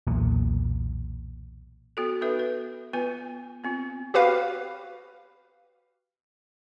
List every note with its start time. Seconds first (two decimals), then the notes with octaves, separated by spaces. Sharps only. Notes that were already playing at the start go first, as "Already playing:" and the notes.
0.07 B1 E2 A#2
1.97 B3 F#4 A4
2.21 B3 D#4 F#4 A4 B4 E5
2.39 B4
2.93 B3 F4 B4 G#5
3.64 B3 C4 F4
4.14 F#4 G4 B4 F5